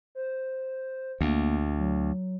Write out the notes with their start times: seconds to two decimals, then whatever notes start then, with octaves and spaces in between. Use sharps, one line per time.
0.15 C5
1.21 D2 A#3
1.78 F#3